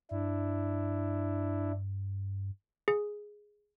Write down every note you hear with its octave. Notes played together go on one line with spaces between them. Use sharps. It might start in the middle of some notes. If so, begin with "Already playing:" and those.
G2 D4 E4
G#4